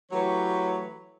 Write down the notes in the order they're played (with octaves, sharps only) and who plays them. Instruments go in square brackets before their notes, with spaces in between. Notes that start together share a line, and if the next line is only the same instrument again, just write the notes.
[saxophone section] E3 F#3 A3 G4 B4 C#5